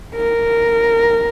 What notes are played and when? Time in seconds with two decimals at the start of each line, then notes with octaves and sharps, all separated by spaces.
0.15 A#4